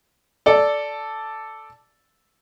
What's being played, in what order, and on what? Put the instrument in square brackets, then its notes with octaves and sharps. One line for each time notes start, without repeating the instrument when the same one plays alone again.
[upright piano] A4 D5